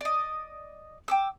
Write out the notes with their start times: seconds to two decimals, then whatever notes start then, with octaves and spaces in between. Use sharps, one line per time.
0.01 D5 D#5
1.08 G5 D6 E6